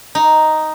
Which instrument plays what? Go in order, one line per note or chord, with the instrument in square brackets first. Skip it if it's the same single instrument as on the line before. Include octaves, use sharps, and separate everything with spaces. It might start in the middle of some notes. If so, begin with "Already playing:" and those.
[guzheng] D#4